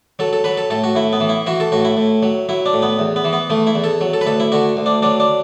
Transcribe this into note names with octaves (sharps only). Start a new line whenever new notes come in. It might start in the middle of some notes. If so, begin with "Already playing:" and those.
F#3 A4
A4
F#3 B4
A4
A2 A4
F#4
A2 E4
B3
E3
E4
E3 F#4
A4
A2 F#4
E4
A2
F#3
F#3 E4
D4
A2
B3
E2
B3
E3
B3
E3 A3
E4
E2
A4
F#3
A4
B4
D2 A4
E4
D3 F#4
D2
D4
F#3 D4
D4